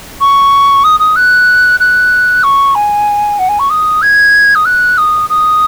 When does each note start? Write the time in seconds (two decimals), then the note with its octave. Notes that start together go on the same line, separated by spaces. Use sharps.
0.21 C#6
0.84 D#6
1.00 D#6
1.16 F#6
1.80 F#6
2.44 C#6
2.75 G#5
3.39 F#5
3.49 G#5
3.59 C#6
3.70 D#6
4.02 G#6
4.55 D#6
4.65 F#6
4.98 D#6
5.30 D#6